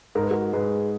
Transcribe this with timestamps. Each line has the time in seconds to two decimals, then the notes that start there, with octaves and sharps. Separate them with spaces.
0.15 G#2 A#4
0.23 B4
0.31 F#4 A#4
0.53 G#2 G#4 B4